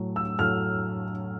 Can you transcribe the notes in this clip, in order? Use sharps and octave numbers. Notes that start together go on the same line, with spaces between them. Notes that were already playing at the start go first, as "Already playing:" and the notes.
Already playing: A2 F#3 A3
E6
A2 F#3 A3 F6